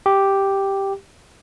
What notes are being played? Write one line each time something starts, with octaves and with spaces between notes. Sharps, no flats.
G4